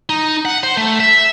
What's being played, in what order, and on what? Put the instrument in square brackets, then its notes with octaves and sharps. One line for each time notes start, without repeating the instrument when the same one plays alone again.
[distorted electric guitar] D#4
F#5
C5
A3
E5